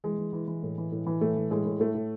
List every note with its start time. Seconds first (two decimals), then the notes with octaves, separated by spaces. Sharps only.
0.04 E3 G#3
0.18 E3
0.33 E3
0.48 E3
0.63 A2
0.78 E3
0.92 A2
1.06 E3
1.21 A2 A3
1.36 E3
1.51 A2 G#3
1.66 A2
1.79 A2 A3
1.94 A2